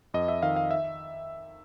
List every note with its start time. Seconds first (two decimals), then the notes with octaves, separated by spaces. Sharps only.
0.14 F2 D#5
0.28 E5
0.43 D#3 F5
0.56 F5
0.71 E5